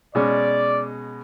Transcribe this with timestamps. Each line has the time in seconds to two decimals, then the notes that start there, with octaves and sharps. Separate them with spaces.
0.15 B2 G#3 C#4 D5